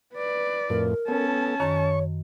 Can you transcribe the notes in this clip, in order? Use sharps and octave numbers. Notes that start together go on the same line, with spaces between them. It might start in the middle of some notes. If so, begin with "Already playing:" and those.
B4 D5
F2 A2 A#4
B3 C#4 A4 A5
F#2 D#3 C#5 C#6